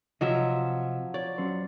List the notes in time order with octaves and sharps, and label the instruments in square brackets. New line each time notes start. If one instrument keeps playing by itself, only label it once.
[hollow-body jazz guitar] C3 D#5 [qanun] F3 F#3 E5
[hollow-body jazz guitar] C#5 [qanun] D5
[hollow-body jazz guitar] F#3 C#4 C5